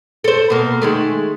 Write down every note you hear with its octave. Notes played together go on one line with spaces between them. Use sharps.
A4 C5
B2 A#3
D#3 G#3 A3